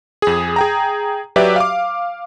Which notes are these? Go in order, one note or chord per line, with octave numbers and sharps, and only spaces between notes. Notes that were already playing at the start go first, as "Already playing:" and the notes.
F2 G#4
G#4 G5 A#5
F#3 G4 B4 D5 E5
F5 D6